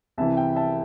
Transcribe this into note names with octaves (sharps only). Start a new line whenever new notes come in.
C2 C3 E3 E5 A5
G5
E5 A5